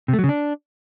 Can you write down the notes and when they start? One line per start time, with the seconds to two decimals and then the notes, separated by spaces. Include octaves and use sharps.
0.08 C3
0.13 A3
0.19 F#3
0.24 C#3
0.29 D4